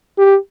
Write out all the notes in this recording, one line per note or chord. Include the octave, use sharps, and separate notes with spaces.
G4